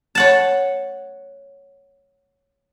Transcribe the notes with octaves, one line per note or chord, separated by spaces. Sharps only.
C#5 F#5 A5